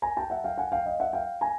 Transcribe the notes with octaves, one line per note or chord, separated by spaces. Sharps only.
G#5 A#5
G5 A5
E5 F#5
F5 G5
F#5 G#5
F5 G5
D#5 F5
E5 F#5
F5 G5
G#5 A#5